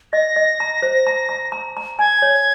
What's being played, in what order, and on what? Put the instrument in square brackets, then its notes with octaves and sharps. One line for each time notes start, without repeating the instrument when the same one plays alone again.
[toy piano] D#5 [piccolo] A#6
[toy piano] D#5
A#5
C5
A#5
A#5
A#5
A#5
[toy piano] G#5 [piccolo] G#6
[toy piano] C#5